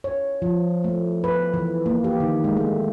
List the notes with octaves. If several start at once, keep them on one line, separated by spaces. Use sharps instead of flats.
C#5
F3
A3
B4
E3
A#3
G4
D#3
G#3
A3